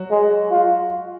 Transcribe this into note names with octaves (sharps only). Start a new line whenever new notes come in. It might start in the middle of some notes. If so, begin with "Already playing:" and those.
Already playing: F#3 F#4
G#3
F4